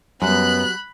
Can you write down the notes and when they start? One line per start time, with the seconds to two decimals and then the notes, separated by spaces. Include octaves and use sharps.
0.22 F#2 F#3 G3 B3 F#4 B5 F#6